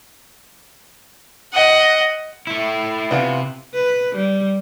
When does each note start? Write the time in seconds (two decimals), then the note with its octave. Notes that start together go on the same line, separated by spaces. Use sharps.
1.53 D#5 F#5
2.47 A3 E4
3.11 C3 E3 B3 F4
3.74 B4
4.15 G3